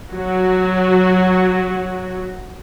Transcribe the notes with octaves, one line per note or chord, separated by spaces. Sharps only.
F#3 F#4